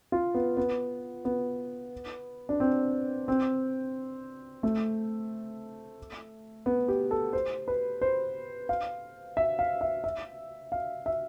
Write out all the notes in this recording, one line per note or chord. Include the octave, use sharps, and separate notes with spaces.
F4
B3
B3
B3
D4
C4
C4
A3
B3
G4
A4
C5
B4
C5
F5
E5
F5
E5
E5
F5
E5